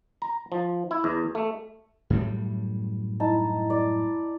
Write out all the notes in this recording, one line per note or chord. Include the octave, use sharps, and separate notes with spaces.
A#5
F3
E4
E2
A3
F#2 A2 G3
D#4 E4 A5
D5